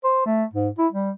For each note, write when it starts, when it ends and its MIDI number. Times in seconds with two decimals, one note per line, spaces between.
0.04 0.21 72
0.26 0.44 57
0.53 0.69 44
0.78 0.87 64
0.92 1.11 55